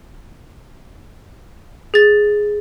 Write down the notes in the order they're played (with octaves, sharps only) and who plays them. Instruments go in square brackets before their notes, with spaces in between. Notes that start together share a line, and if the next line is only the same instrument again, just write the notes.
[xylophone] G#4 A6